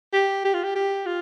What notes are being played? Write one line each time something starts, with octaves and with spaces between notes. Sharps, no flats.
G4
G4
F4
G4
G4
F4